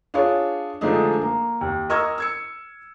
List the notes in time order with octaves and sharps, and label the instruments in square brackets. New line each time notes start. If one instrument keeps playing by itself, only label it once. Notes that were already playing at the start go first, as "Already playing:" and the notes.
[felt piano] D4 F4 G#4 C#5
D3 F3 G#3 A3 D4 D#4
A#3
D#2
A#4 D#5 C#6 E6 F6 G#6
E6 G#6 C#7